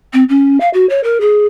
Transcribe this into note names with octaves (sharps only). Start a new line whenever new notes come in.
C4
C#4
F5
F#4
C#5
A#4
G#4